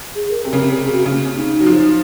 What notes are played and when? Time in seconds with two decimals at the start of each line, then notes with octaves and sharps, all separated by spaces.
0.15 G#4
0.30 A#4
0.45 C3 A#4
0.53 C#3
0.59 C3
0.76 G#4
0.91 F#4
1.06 C#3 C#4
1.13 A#3
1.21 C4
1.35 D#4
1.60 F#3
1.66 F3